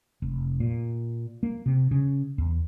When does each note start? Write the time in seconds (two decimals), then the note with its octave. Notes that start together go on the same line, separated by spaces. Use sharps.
0.22 F1
0.60 A#2
1.43 A#3
1.66 C3
1.91 C#3
2.38 E2